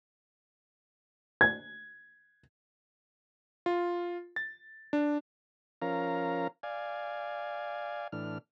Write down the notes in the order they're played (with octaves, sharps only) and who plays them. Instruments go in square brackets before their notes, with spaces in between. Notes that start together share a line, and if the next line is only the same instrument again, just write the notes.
[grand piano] G#6
[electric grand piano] F4
A6
D4
[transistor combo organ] F3 C#4 A#4 F5 A#5
D5 F5 G#5
A2 E3 D4 F6